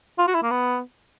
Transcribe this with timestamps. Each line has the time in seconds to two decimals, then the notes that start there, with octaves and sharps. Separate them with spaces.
0.18 F4
0.27 F#4
0.34 E4
0.43 A#3
0.51 B3